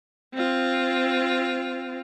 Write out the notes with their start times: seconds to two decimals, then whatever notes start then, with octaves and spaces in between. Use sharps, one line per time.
0.34 C4 F4